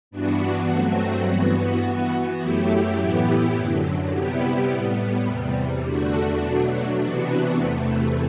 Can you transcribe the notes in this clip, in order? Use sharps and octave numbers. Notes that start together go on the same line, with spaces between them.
G2 E3 B3 D4 F#4
G2 F#3 A3 C4 F#4
G2 E3 B3 F#4
E3 B3 F#4
F#2 F#3 A3 E4 G4
A2 E3 B3 E4 G4
F#2 D3 F#3
C3 G3 B3 E4 G4
A2 G3 B3
E2 C3 G3
E2 D3 A3 D4 F#4
B2 F#3 A3 D4
C3 E3 B3 D4 F#4
E2 C3 E3 A3